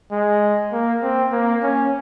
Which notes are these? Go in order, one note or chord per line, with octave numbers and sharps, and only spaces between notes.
G#3
A#3
C4
A#3
C#4